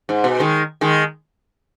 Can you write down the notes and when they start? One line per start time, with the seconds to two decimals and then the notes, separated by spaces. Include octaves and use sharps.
0.09 G#2
0.24 B2
0.40 D#3 G#3
0.81 D#3 G#3